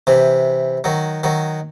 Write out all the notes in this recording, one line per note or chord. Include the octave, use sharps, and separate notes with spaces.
C3 E3
D#3 F#3
D#3 F#3